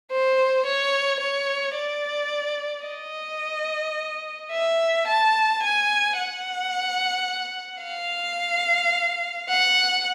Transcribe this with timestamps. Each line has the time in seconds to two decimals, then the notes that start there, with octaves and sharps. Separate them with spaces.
0.11 C5
0.66 C#5
1.21 C#5
1.75 D5
2.86 D#5
4.51 E5
5.07 A5
5.62 G#5
6.17 F#5
7.83 F5
9.49 F#5